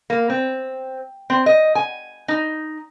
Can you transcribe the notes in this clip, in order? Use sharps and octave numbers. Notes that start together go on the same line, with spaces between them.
A#3
C4
C4
D#5
G#5
D#4